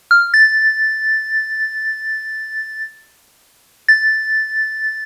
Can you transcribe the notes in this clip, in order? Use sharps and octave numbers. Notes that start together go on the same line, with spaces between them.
F6
A6
A6